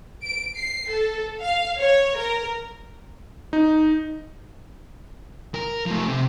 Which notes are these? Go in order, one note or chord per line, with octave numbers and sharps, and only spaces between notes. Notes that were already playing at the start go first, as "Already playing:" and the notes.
D7
C7
A4
F5
C#5
A#4
D#4
A#4
F3 A3
C3